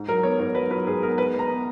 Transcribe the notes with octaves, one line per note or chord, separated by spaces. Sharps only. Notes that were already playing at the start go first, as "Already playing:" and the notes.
Already playing: G#2
F#3 A#4
B3 C#5
G#2 C#5
F#3 B4
F#3 B4
G#2 G#4
B3 A#4
G#3 B4
G#3
A#5
B3